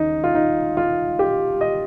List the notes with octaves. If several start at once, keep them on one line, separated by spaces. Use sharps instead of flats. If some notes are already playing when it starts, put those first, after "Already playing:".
Already playing: D#2 C#3 D#4
F4
D#4
F4
G4
D#5